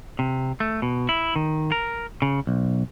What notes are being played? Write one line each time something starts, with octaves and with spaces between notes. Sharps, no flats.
C3
A3
B2
E4
D#3
A#4
C#3
B1